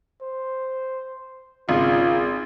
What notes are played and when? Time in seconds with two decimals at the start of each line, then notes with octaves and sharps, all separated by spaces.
0.22 C5
1.69 G#1 C#3 F4